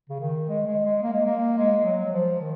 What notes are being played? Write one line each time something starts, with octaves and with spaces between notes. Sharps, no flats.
C#3
D#3
G#3
G#3
G#3
A#3
G#3
A#3
G#3
F#3
F#3
F3
D#3